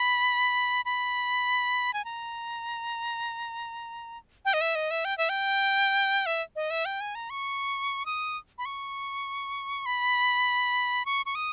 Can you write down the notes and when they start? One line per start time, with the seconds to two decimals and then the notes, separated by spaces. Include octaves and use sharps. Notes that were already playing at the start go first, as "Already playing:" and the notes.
Already playing: B5
0.85 B5
1.94 G#5
2.05 A#5
4.45 G5
4.54 D#5
4.61 E5
4.75 D#5
4.91 E5
5.05 G5
5.18 E5
5.29 G5
6.26 E5
6.56 D#5
6.70 E5
6.85 G5
7.01 G#5
7.15 A#5
7.30 C#6
8.06 D#6
8.58 B5
8.65 C#6
9.86 B5
11.06 C#6
11.26 C#6
11.35 D#6